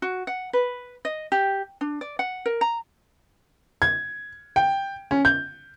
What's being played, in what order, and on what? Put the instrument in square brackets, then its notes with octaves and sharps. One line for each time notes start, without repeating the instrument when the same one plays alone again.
[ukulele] F#4
F#5
B4
D#5
G4
D4
D5
F#5
A#4
A#5
[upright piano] G#6
G5
C#4
G6